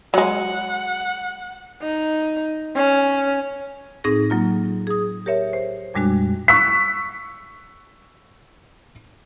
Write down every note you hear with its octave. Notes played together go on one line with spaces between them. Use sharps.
F#3 G#3 F#5
D#4
C#4
A2 C4 D#4 G#4 A#6
F#3 A#3 F4
G#4 D#6
G4 A#4 C#5 E5
C5
F2 A#2 G3 G#3 D4 F#4
C#6 E6 F#6 B6